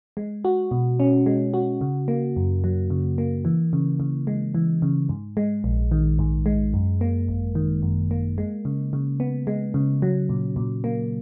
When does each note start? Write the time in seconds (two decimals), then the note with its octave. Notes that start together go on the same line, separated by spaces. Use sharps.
0.17 G#3
0.45 F#4
0.71 B2
1.00 C#4
1.26 G#3
1.54 F#4
1.81 C#3
2.08 A#3
2.36 F#2
2.64 F#3
2.90 C#3
3.18 A#3
3.45 E3
3.73 C#3
4.00 C#3
4.27 G#3
4.55 E3
4.82 C#3
5.09 G#2
5.37 G#3
5.64 A#1
5.92 D#3
6.19 G#2
6.46 G#3
6.74 F#2
7.01 A#3
7.29 G#1
7.55 D#3
7.83 F#2
8.11 A#3
8.38 G#3
8.65 C#3
8.93 C#3
9.20 B3
9.47 G#3
9.74 C#3
10.02 F#3
10.29 A#2
10.56 A#2
10.84 A#3